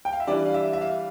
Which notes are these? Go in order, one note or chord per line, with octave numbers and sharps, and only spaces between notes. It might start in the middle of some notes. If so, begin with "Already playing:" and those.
G5
F5
E5
E3 G3 D4 D5
F5
E5
E5
F5